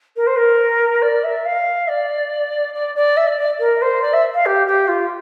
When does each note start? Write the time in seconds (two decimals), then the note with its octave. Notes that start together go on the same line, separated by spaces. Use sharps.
0.16 A#4
0.26 C5
0.36 A#4
1.02 D5
1.23 E5
1.45 F5
1.88 D5
2.74 D5
2.95 D5
3.17 E5
3.27 D5
3.37 D5
3.59 A#4
3.81 C5
4.02 D5
4.13 E5
4.34 F5
4.45 G4
4.67 G4
4.88 F4